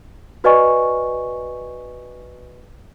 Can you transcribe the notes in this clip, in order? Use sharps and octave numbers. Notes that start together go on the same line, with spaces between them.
F#4 B4 D5 D#5 G#5 C#6